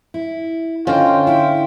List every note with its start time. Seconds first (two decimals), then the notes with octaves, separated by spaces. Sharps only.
0.14 E4
0.87 D3 C#4 F4 C5 D#5 G5
1.27 E4 G5